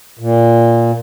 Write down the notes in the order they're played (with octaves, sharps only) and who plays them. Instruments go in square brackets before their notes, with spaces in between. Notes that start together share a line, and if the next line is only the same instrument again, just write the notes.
[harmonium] A#2